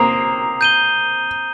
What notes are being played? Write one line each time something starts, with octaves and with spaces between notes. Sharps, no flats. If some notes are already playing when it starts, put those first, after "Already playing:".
Already playing: A#3 C4 A#5 D#6 C7 F7
G6 D#7 G7